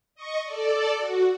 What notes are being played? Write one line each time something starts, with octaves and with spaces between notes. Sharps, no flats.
D#5 C#6
A4 D5
F#4